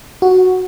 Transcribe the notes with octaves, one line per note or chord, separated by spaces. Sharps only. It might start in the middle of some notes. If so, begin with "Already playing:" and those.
F#4